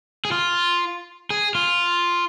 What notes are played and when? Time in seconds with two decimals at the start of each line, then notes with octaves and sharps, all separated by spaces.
0.25 G#4
0.32 F4
1.30 G#4
1.55 F4